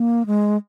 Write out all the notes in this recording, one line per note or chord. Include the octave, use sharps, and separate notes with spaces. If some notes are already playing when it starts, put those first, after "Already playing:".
Already playing: A#3
G#3